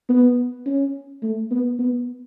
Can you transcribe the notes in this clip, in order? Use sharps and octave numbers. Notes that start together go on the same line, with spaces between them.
B3
C#4
A3
B3
B3